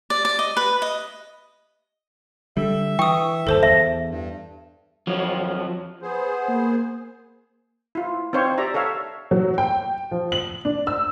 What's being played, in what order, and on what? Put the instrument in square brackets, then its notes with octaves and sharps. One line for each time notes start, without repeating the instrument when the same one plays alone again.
[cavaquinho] D5
D5
D#5
B4
D#5
[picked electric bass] D3 G3 [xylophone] A4 [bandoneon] E5
[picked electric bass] E3 [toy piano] G5 [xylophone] C#6 D#6
[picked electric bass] G1 D#2 [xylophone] A4 C5 A5
[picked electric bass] E2 [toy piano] E5 [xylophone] A5
[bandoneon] G2
[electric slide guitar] F2 F3 F#3
[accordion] B3 G#4 C5
[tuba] A#3
[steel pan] E4 F4
C4 D#4 C5 C#5 F5
G4 D5 E5 A#5
A4 C#5 E5 F5
[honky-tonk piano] F#3
G5
F3
F#7
D4
E6